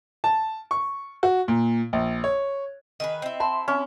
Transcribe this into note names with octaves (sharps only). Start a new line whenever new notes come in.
A5
C#6
F#4
A#2
A#1
C#5
D#3 G#4 B4 D#5
C4 E4
E5 A5 B5 C6
C4 C#4 E4